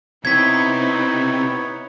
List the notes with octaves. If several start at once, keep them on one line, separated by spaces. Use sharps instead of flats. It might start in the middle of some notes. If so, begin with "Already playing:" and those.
C3 B3 D#4 E4 C#5 G#6 B6